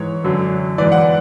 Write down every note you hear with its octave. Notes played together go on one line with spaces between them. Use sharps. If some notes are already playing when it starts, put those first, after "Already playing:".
Already playing: G#2 E3 C#5
F#2 D3 F#3
G#2 E3 D5
F#5